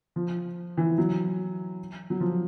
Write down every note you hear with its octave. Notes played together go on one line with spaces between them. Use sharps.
F3
E3
F#3
F#3
F3